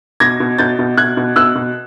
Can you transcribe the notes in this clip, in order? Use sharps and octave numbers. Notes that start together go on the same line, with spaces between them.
B2 G#6 A#6
B2
B2 G6 A6
B2
B2 F#6 G#6
B2
B2 E6 F#6
B2